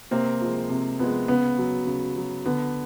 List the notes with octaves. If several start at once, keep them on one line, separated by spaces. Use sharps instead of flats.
C3 A#3 C4
F3 G#3
C3
F3 G#3 B3
C#3 B3
F#3
C#3
F#3
D3 B3